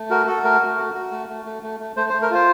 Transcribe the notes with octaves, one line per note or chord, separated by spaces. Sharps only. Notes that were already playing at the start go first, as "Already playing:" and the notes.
Already playing: A3
F#4 A#4
F#4 A4
A3 A#4
A3
F#4
F#4
A3
A3
A3
A3
A3
A3 C5
C5
A3
A#4
F4 C5